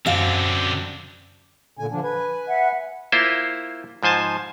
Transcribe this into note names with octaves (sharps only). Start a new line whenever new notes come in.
F#2 D3 C4 F5
A#2 D3 G#5
D3 F3 D4
B4 G#5
E5 F#5
A#3 E4 F4 C5
G#2 F3 C5 G#5 A5